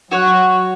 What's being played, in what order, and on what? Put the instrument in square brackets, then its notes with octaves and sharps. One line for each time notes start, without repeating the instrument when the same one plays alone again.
[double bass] F#3 [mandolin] F#4 C#5 F#5